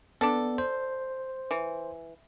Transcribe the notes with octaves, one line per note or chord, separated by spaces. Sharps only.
B3 D4 A4
C5
E3